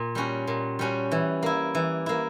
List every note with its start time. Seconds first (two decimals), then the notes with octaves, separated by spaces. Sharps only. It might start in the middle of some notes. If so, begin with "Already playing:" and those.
Already playing: A#2
0.15 G3 C#4 F#4
0.47 A#2
0.79 G3 C#4 F#4
1.12 E3
1.43 A#3 E4
1.75 E3
2.06 A#3 E4